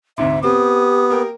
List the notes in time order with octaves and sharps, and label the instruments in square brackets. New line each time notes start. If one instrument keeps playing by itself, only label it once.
[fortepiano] D2 G#2 C3 [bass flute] E5
[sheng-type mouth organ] B3 [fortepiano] C4 [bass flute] G4 [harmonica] D#6
[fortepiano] A#3 A#4 G5